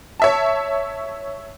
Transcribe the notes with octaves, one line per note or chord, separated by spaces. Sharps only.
C#5 E5 A5